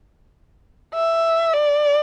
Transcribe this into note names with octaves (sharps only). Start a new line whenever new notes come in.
E5
D5